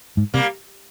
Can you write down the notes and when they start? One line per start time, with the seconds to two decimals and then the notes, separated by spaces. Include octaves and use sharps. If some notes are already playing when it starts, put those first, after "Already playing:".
0.17 G#2
0.34 C3 G3 A#3